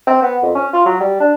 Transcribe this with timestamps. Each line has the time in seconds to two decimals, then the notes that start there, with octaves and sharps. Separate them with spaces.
0.07 C4
0.22 B3
0.42 F2
0.55 C#4
0.73 F4
0.86 F#3
1.00 G3
1.20 D4